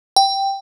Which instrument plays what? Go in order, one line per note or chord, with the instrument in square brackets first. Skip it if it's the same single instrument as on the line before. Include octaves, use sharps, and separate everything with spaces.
[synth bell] G5